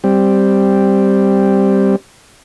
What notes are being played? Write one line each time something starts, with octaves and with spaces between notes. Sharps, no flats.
G3 C4